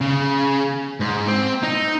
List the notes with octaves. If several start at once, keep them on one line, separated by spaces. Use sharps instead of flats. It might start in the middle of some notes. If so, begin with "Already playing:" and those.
C#3
G#2
C4
D#4